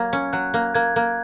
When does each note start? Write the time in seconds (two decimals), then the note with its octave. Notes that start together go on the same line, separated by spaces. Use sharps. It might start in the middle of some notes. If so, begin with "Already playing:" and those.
Already playing: F#3 A#3 G#6
0.13 C#4
0.33 F#3 F#6
0.54 A#3
0.74 A#3 G#6
0.96 A#3